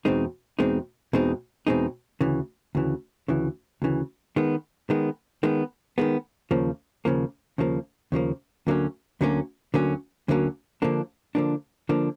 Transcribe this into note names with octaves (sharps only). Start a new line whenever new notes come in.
E2 B2 G#3 C4 D#4
E2 B2 G#3 C4 D#4
E2 B2 G#3 C4 D#4
E2 B2 G#3 C4 D#4
D2 C#3 E3
D2 C#3 E3
D2 C#3 E3
D2 C#3 E3
D#3 G#3 B3
D#3 G#3 B3
D#3 G#3 B3
D#3 G#3 B3
D#2 C#3 F3 A#3
D#2 C#3 F3 A#3
D#2 C#3 F3 A#3
D#2 C#3 F3 A#3
D2 D3 F#3 A#3 C#4
D2 D3 F#3 A#3 C#4
D2 D3 F#3 A#3 C#4
D2 D3 F#3 A#3 C#4
D3 F3 A#3 D4
D3 F3 A#3 D4
D3 F3 A#3 D4